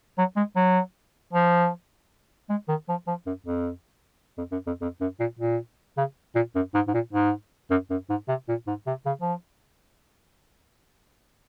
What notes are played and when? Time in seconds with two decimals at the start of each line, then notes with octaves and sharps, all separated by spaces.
0.18 F#3
0.37 G#3
0.56 F#3
1.33 F3
2.50 G#3
2.69 D#3
2.89 F3
3.08 F3
3.27 F#2
3.47 F2
4.38 F2
4.52 F#2
4.67 F2
4.81 F2
5.01 F#2
5.20 A#2
5.39 A#2
5.98 C#3
6.35 A#2
6.55 F#2
6.74 G#2
6.88 G#2
6.94 A#2
7.13 G#2
7.71 F#2
7.90 F#2
8.10 G#2
8.28 C3
8.49 A#2
8.67 G#2
8.87 C3
9.06 C#3
9.21 F3